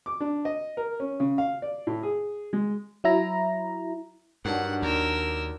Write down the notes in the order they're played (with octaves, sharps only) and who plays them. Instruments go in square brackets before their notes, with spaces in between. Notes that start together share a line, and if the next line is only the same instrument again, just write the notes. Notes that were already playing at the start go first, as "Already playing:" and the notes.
[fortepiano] D6
D4
D#5
A#4
C#4
C#3
F5
D5
A2
G#4
G#3
[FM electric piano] F#3 E4 A#5
[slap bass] G2 [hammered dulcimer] D#3 F#3 D4 [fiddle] F#5
[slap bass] D#2 [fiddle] A#4 E6